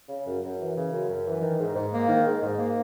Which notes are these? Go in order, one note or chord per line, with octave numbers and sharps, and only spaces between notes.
C#3
F#2
F#2
E3
C#3
F#2
F#2
E3
D#3
G#2
G#2
A#3
D#3
G#2
G#2
A#3